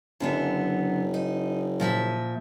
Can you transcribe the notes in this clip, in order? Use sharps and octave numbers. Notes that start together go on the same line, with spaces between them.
F#1 F#2 D3 B3
D#4
A#2 F3 E5